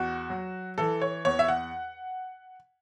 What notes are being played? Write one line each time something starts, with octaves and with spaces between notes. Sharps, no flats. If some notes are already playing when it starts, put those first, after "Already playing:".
Already playing: E2 F#4
F#3
E3 A4
C#5
E2 C#5
E5
F#5